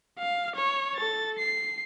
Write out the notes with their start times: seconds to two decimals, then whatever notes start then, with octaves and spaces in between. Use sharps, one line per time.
0.19 F5
0.56 C#5
0.97 A4 A6
1.39 C7